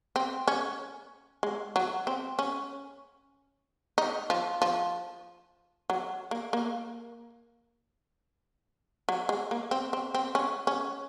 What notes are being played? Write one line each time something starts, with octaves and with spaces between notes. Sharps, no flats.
C4
C#4
G#3
F#3
C4
C#4
D#4
F3
F3
F#3
A#3
A#3
F#3
G#3
A#3
C4
C4
C4
C#4
C#4